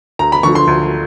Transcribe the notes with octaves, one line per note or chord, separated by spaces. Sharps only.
D2 A#5
B5
D3 F3 C#6
C6
D2